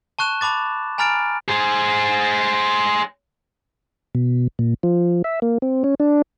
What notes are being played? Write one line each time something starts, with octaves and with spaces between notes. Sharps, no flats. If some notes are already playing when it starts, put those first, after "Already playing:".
A5 C#6 F#6 E7
A5 B5 D6 A6
G#5 A#5 B5 F6 A6 D7
G#4 C5
B2
A#2
F3
E5
A#3
C4
C#4
D4